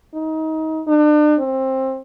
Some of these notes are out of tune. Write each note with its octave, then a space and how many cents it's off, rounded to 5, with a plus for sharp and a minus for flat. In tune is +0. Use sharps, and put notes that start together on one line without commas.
D#4 +25
D4 +40
C4 +20